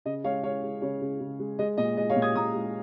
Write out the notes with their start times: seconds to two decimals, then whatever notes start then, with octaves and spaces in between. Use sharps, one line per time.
0.05 C#3 D#5
0.24 G#3 C#5 F5
0.43 G#3 C#5 F5
0.63 G#3
0.82 C#3 C#5
1.01 C#3
1.20 C#3
1.39 G#3
1.59 G#3 D#5
1.77 A#2 D#5
1.97 G#3 D#5
2.10 C#5 F5
2.16 A#2
2.22 D#6 G#6
2.35 A#2 A#5 D#6
2.55 G#3